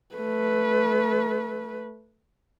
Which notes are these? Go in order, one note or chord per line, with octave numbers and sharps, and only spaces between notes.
A3 B4